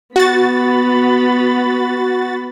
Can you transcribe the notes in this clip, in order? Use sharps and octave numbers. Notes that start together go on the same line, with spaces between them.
B3 F#4 B5 A6